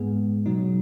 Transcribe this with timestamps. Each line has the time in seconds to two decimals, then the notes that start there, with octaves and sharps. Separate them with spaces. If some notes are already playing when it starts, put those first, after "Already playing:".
Already playing: G#2 G#3 B3 G#4
0.46 B2 F#3 D#4